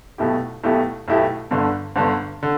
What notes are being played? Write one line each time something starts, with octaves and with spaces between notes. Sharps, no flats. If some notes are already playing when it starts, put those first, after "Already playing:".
B1 B2 A3 E4 G4
B1 B2 A3 E4 G4
B1 B2 A3 E4 G4
G1 G2 D3
G1 G2 D3
D3